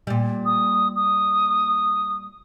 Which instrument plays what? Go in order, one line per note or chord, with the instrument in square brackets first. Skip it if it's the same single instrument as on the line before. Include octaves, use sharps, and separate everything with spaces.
[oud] A#2 G3
[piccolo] D#6
D#6